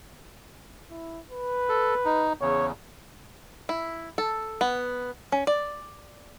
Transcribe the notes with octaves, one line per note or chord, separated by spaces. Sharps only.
E4
B4
A4
D#4
E2 C#3 C#5
E4
A4
B3
C#4
D5